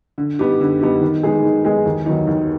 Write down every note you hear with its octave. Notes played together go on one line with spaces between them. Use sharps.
D3
G3 B3 D#4 G4
D3
G3 B3 D#4 G4
D#3
G#3 B3 D#4 G#4
D#3
G#3 B3 D#4 G#4
D#2
D#3 F#3 B3 D#4
D#2